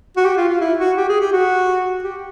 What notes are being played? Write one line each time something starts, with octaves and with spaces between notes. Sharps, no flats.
F#4
G4
F4
F4
E4
F#4
G4
G#4
G4
F#4
G4